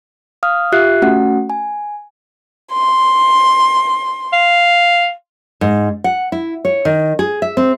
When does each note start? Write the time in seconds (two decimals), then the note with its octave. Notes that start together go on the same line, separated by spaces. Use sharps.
0.43 F5 D#6 F6
0.72 F4 G4 E5 F#6 C7
1.02 A3 C#4 F#4 F#5
1.50 G#5
2.72 C6
4.33 F5
5.61 G#2
6.04 F#5
6.32 E4
6.65 C#5
6.85 D#3
7.19 G#4
7.42 E5
7.57 C4